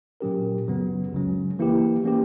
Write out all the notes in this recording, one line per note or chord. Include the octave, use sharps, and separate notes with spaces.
A#2 F#3 C#4 G4 A#4
F#2 C#3 F#3 B3
C#2 C#3 F#3 C#4
E3 A#3 E4 G4
E3 A#3 C#4 G4